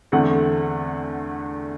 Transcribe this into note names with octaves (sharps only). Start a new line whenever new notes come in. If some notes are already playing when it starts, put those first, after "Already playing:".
E2 D3 A3 C4 F#5